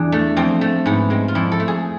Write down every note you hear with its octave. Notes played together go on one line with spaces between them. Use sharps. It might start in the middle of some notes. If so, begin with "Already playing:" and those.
Already playing: E2 D4
A3
F2 C4
A3
G#2 B3
G#3 C4
F4
F2 E4
A4
A3
G#4